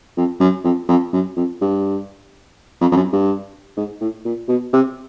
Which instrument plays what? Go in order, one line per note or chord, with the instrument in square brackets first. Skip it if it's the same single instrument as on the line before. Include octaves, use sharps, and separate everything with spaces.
[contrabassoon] F2
F#2
F2
F2
F#2
F2
G2
F2
F2
F#2
G2
G#2
A2
A#2
B2
C3